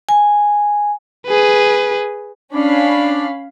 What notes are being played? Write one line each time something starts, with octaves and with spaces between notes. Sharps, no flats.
G#5
G#4 B4
C#4 D4 F5 B5